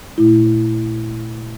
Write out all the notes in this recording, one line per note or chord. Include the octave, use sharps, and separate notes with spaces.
A#2 A3 E4